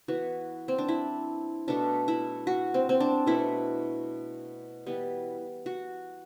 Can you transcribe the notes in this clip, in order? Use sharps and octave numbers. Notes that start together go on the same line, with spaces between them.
E3 B3 F#4
C4
D4
E4
B2 A3 D4
E4
F#4
C4
C4
D4
B2 A3 E4
E3 G3 B3
F#4